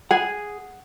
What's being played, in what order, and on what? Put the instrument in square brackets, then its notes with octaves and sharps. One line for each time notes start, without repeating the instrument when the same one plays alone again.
[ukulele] G#4 G#5 [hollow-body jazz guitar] F#5